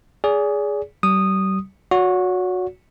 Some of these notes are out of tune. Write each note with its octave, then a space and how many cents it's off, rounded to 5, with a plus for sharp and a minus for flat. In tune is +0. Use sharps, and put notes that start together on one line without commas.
G#4 +0 D5 -35
G3 -40 D#6 -10
F#4 -20 C#5 +40